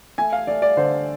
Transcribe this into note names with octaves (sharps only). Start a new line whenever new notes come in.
A3 G#5
F5
A3 D5
D5
D3 C5